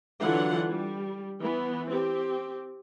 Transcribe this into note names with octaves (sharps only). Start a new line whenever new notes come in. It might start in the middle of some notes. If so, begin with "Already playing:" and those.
D3 E3 F#3 F4 F#5
G3
E3 B3
C4 G4